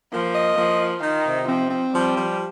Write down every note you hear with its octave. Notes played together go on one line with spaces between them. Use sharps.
F3 A#3
D#5
F3 A#3
F4
D#3 D#4
C3
F3 C4
C4
F3 G3
F3